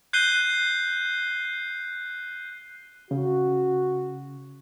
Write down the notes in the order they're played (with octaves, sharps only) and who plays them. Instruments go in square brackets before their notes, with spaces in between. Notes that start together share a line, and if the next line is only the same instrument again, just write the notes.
[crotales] F#6 G6 C7 D#7 G7
[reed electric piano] C#3 [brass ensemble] F#4